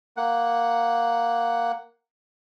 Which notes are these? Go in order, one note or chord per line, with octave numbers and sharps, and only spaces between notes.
A#3 F#5